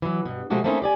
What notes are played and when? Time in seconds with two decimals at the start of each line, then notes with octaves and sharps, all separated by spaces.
0.02 E3 F#3
0.25 G2 B2
0.50 B2 F3 G#3 A3 F#4 G4
0.64 A3 A#3 C4 C#4 D#4 E4
0.82 G4 D5 G#5